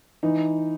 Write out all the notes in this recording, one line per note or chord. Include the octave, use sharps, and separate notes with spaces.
E3 D#4